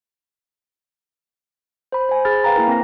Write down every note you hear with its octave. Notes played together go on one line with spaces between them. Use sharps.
C5 B5
C5 G#5
G#4 B5 F6 A6
B4 F5 G5 G#5 A#5 B5
A#3 E4 A#4
C4 A#4 A#6